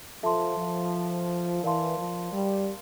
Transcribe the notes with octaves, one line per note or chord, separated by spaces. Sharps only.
F3 A4 E5 A5 C6
F3
E3 A#4 D5 F5 A5 C6
F3
G3